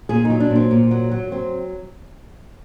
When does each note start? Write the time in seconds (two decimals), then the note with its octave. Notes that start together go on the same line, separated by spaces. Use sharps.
0.09 A#2 G#4
0.25 F#3 D#4
0.40 D4
0.50 A#2
0.55 C4
0.71 A#2
0.91 F#3
1.11 F#3
1.32 F#3 C4